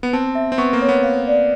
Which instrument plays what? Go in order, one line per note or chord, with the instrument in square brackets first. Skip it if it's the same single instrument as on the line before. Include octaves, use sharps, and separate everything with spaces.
[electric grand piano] B3
[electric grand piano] C4 [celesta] A5
[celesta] E5
[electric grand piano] C4
[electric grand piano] B3 [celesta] C#6
[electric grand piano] A#3
[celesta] C#5
[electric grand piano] B3
[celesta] F5
D5